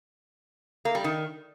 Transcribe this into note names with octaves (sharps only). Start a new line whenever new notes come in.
A#3
G3
D#3